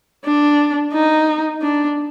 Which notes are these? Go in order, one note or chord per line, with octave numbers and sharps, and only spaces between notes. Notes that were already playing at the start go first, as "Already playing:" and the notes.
D4
D#4
D4